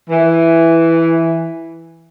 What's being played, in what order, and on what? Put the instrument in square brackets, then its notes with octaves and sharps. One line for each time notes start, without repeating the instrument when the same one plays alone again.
[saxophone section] E3